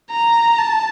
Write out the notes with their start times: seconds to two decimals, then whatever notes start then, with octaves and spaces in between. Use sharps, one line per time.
0.11 A#5
0.59 A5